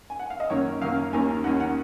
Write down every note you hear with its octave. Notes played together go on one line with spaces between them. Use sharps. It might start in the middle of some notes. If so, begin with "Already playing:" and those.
G#5
F#5
F5
D#5
F#2 D#3 A#3 C#4 C#5
F#2 D#3 A#3 C#4 F5
D#2 D#3 A#3 C#4 G#5
D#2 D#3 A#3 C#4 F#5
F#5